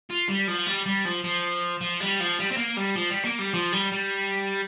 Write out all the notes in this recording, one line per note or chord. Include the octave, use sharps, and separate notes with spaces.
F4
G3
F3
G3
G3
F3
F3
F3
G3
F3
G3
C4
A#3
G3
F3
G3
A#3
G3
F3
G3
G3